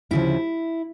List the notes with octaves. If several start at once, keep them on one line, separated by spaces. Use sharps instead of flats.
D2 C#3 F3 E4